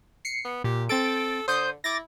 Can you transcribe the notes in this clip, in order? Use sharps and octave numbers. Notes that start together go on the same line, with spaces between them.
C7 C#7
B3
A#2 G4
C4 A4 A6 D7
D3 C5 D#6 G6
E4 D6 A6 A#6